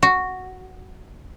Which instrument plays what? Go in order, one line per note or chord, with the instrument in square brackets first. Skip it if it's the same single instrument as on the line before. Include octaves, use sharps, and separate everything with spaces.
[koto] F#4